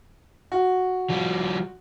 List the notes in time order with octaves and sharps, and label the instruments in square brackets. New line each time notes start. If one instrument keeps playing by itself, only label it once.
[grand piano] F#4
[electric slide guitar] F3 G3